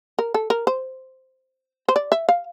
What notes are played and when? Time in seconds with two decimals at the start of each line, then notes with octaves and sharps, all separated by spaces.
0.19 A#4
0.34 A4
0.50 A#4
0.67 C5
1.89 C5
1.96 D5
2.12 E5
2.29 F5